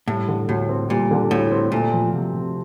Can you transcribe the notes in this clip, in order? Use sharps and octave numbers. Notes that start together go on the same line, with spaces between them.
A2 G3
D3
D2 A2
C4
A#2 G3
D3
D2 A2
C4
A#2 A3
F3
C3
C3